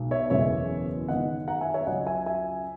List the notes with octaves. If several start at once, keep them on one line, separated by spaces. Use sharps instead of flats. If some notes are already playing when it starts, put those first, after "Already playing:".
Already playing: B1 B2 G#3
C#5 E5
F#1 E2 B2 G#3 C#4 C#5 E5
F#2 D#3 G#3 B3 D#5 F#5
F#5 A#5
E5 G#5
C#5 E5
C#2 C#3 F#3 D#5 F#5
E5 G#5
E5 G#5